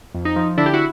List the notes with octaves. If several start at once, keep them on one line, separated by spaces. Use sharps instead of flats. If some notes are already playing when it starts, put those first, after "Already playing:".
F2
D#4
F3
D3 D4 E4
G4
E4 F#4